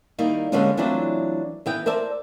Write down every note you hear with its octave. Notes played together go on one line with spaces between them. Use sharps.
D#3 G3 A#3 D#4 E4
D3 G3 G#3 A#3 B3 C#4
E3 F#3 A3 C4 D4 F4
E3 B3 G5
A#4 C5 D5 E5 A5